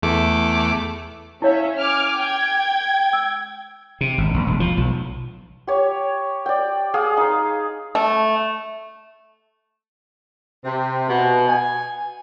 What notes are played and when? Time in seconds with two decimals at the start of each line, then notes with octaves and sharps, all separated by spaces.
0.02 E2 A3 D6
1.42 C#4 E4 C#5 E5 F5
1.78 G#5 D6 F6
2.17 G5 G#6
3.13 E6
4.01 C3
4.18 G#1
4.34 A#1
4.47 E1
4.60 F3
4.77 B1
5.67 G4 C#5
6.46 D5 G5
6.94 G#4 F5 D#6
7.17 D#4 C6
7.95 A3
10.64 C3
11.08 B2
11.47 G#5